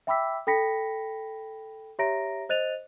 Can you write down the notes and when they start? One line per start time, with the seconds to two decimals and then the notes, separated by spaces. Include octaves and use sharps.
0.07 E5 G5 B5 D6 E6 B6
0.47 A4 G5 B5 A#6 B6 C#7
1.99 G4 C#5 E5 A#5 A#6 D7
2.49 C5 D#5 F#6 A6 D#7 F7